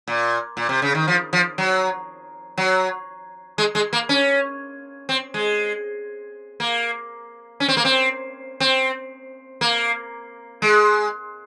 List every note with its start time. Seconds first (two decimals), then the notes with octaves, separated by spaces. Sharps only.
0.08 A#2
0.57 A#2
0.69 C3
0.82 C#3
0.95 D#3
1.08 F3
1.33 F3
1.58 F#3
2.58 F#3
3.58 G#3
3.75 G#3
3.93 A#3
4.09 C#4
5.09 C4
5.34 G#3
6.60 A#3
7.60 C#4
7.68 C4
7.77 A#3
7.85 C4
8.60 C4
9.61 A#3
10.62 G#3